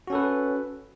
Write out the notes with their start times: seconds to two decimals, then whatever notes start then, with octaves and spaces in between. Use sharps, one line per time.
0.07 F#4
0.10 C#4
0.13 A4
0.15 B4